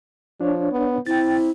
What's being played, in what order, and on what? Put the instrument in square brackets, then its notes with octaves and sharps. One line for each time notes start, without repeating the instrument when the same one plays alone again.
[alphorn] F3 [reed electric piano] D4 C#5
[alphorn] B3
[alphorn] C4 [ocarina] E4 [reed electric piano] G5 A6